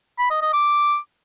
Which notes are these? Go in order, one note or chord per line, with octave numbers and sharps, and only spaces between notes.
B5
D#5
D#5
D6